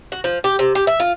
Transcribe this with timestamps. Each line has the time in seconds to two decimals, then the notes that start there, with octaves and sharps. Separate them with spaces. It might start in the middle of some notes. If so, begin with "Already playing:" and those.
0.12 F#4
0.24 F3
0.44 G4
0.59 C3
0.75 G4
0.87 E5
1.00 F4